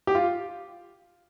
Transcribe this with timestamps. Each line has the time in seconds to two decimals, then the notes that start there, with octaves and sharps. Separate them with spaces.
0.07 G4
0.15 F4